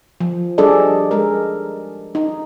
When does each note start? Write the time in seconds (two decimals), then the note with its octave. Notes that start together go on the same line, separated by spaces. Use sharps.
0.20 F3
0.58 G3 D4 G#4 A4 D5 D#5
1.11 G#3 A#4
2.15 D#4